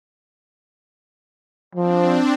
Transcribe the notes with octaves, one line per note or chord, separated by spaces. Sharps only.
F3 C4 D4